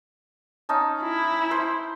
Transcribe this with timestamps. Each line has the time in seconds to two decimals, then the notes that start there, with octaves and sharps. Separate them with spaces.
0.69 C#4 D#4 A5
1.03 E4
1.51 C5